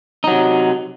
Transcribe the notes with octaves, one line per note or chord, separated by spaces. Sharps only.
C3 F#3 D#4